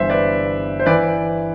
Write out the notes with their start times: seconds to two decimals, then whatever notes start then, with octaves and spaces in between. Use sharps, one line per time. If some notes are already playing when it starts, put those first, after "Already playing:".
Already playing: G1 G2 E3 C5 E5
0.10 B4 D5
0.79 C5
0.86 E3 B4 D5